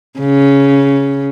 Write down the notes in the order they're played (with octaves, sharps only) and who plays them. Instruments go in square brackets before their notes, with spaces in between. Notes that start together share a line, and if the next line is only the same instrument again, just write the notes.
[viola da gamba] C#3